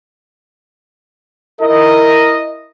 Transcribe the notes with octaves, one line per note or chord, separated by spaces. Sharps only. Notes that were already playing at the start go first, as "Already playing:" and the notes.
E4 A#4 D#5